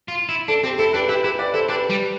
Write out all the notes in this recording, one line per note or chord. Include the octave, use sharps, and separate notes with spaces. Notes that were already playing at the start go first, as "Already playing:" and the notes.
F4
E4
D4 A4
C4 G4
E4 A4
D4 G4 B4
E4 G4 B4
E4 G4 B4
B4 D5
E4 A4 C5
D4 G4 B4
G3